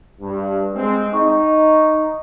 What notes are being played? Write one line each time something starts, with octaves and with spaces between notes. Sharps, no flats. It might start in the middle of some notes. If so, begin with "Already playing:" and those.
G2
G#3 C4
D#4 D#5 C#6